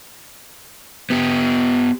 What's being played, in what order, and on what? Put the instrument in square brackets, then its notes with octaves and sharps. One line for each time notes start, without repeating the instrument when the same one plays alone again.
[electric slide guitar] B3 G4